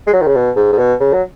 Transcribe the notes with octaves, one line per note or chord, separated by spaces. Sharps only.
G#3
F#3
D#3
C#3
B2
G#2
G#2
B2
C#3
F#3